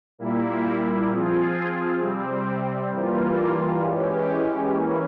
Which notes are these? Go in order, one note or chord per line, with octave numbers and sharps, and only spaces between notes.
A#2 G3 A#3 E4
F3 C4 F4 G#4
C3 G3 C4
G2 E3 G3 A#3 F4
E3 G#3 C#4 G4
E3 A#3 C#4